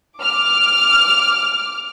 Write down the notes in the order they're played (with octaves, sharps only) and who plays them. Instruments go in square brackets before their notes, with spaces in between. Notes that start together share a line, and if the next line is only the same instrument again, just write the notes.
[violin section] D6 F6